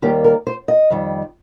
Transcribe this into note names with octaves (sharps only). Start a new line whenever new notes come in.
D#2 D#3 G3 A#3 G4
A#4
C5
D#5
F2 D#3 G3